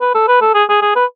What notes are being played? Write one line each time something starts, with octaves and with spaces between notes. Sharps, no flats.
B4
A4
B4
A4
G#4
G#4
G#4
B4